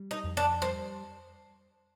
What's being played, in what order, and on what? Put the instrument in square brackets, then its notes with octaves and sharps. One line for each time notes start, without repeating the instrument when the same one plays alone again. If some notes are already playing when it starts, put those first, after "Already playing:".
Already playing: [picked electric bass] G3
[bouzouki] D#4
[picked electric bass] F2
[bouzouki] D4
[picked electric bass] G3 [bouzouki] C4